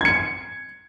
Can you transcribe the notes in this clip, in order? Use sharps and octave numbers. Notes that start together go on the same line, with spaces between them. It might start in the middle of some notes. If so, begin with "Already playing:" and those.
G#6 C#7